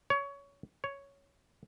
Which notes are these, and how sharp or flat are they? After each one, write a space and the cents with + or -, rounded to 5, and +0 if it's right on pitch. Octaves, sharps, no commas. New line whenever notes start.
C#5 +20
C#5 +5